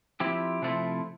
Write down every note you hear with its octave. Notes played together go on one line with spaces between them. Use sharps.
F3 C4 E4 G4
C3 F3 A3 C4 E4